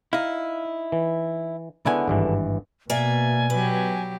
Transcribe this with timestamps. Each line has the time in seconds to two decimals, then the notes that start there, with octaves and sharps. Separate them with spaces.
0.13 D#4 E4 F5
0.92 E3
1.86 C#2 D3 B3 E4 G#5
2.08 G#1 G2 E3
2.90 B2 A#3 D5 E5 G#5
3.50 F#3 G4 B4